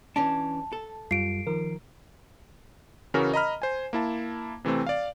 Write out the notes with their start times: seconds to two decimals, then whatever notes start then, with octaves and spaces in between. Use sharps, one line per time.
0.16 E3 C#4 D4 A5
0.73 A4
1.11 F#2 G3 F4 C7 D7
1.47 D#3 F3 A#4
3.14 C#3 E3 C#4 F#4 A#4
3.33 D#5 A#5 B5 F6
3.62 C5 G#5
3.93 A#3 E4 A5
4.64 C3 E3 A3 C4
4.87 D5 F5